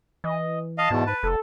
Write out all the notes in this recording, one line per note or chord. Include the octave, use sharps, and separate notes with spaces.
E3 D#5
D#5 F5 A5
E2 G#2 B2
B4
F1 A4